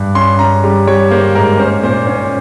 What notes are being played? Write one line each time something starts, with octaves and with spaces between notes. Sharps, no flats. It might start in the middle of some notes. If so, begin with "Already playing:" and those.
Already playing: G2
C#4 C6
C#4 A#5
G3
G3 C#5
A#3 C5
G#2 A#4
C#4 C5
A#2 C5
C#4 C5